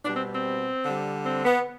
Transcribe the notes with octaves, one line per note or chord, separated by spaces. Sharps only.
B2 G3 D4
C4
C4
D3 G3
C4
B3